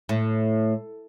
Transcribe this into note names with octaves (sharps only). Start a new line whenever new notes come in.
A2